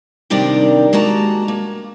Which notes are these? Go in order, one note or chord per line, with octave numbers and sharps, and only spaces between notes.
C3 D#3 G3 D4 A#4 G5
G#3 A#3 F#4 A5 A#5
A#3